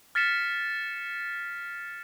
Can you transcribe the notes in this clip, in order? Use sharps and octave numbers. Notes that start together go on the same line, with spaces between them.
F6 A6 B6 C#7 E7